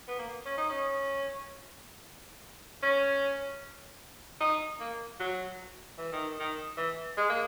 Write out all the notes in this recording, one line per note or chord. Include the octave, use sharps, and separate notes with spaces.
B3
A#3
C#4
D#4
C#4
C#4
D#4
A#3
F#3
E3
D#3
D#3
E3
G#3
A#3